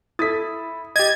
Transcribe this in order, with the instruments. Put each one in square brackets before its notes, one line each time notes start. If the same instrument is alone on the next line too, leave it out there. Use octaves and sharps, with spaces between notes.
[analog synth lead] E4 [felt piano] A4 D#6 [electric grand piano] A6 B6
[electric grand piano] G4 D#5 [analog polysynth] G#6 [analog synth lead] A6